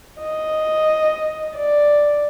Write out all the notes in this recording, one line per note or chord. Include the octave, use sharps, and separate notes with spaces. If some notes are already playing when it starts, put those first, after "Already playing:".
D#5
D5